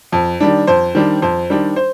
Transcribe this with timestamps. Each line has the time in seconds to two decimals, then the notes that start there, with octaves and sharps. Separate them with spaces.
0.12 F2
0.40 D#3 G3 D4
0.67 F2 C5
0.95 D#3 G3 D4
1.22 F2 C5
1.50 D#3 G3 D4
1.76 C5